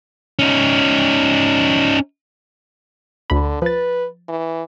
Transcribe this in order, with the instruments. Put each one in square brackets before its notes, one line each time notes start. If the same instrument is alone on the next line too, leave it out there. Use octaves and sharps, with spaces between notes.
[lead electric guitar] C#4 D#4
[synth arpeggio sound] D2 B5 [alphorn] D3
[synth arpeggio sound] F3 A6 [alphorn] B4
[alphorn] E3